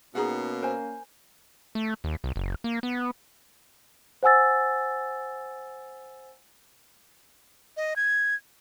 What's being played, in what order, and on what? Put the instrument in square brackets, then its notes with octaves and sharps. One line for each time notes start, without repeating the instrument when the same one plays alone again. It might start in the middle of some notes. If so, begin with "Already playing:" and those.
[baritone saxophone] B2 [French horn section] A#3 C#4 [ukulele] D#4 G#4 F#5
[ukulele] A#4 C5 G#5
[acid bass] A3
D#2
C2
F#1
A#3
B3
[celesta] C5 F#5 G#5 E6 A6
[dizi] D#5
G#6